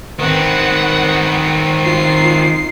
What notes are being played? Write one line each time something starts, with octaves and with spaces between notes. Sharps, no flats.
D#3 C4 B4 F#5
D#4 F4 C7